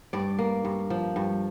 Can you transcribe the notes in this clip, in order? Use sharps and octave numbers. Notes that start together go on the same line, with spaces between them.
G2 D5
A#3
G2
F3
G2